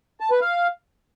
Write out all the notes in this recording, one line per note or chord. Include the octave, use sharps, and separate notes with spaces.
A5
B4
F5